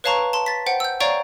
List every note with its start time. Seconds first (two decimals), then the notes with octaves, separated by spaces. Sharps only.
0.04 B4 C#5 F5 A5 A#5 C#6
0.33 A5 C6
0.46 A6 B6
0.66 C5 F#5 G5
0.80 E6 G6
1.00 C#5 D5 F5 G5 A#5 C#6